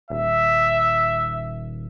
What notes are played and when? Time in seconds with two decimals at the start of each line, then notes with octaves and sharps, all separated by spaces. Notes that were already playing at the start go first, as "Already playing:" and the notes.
0.10 D#1 E5